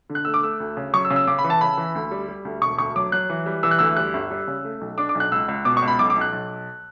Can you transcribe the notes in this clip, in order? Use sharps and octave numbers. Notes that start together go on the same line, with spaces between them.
D3
F#6
A3 E6
D6
A3 E6
D2
C#3
F#3 C#6
E6
C#3
E6
C#3 D6
B5
E3
A5
C#3 B5
E3
D2
G3
G3
D2
E1 C#6
D2 C#6
F#3 D6
F#3 F#6
E3
G3
E3 E6
F#6
D2 E6
G3 F#6
G1
G3
C#3
A3
B1
D4 D6
D6
B1
F#6
C#2 E6
C#2
B2 D6
C#6
C#2
B5
B1 D6
D6
B1
F#6
B1